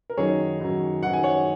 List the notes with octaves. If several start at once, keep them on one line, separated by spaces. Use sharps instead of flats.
A#4
F#2 D#3 F#3 D#4 G#4 C#5
F#2 D#3 F#3 D#4
F#2 D#3 F#3 D#4 F#5
G#5
C#5 F#5